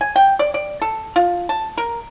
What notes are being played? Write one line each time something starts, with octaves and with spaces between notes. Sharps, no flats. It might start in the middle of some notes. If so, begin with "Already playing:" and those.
G#5
G5
D5
D5
A4
F4
A5
A#4